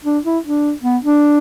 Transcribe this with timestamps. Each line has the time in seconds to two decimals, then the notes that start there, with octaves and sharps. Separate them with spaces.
0.04 D4
0.25 E4
0.44 D4
0.83 B3
1.02 D4